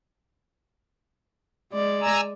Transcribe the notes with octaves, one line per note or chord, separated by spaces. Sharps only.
G#3 D5
G#5 A#5 E6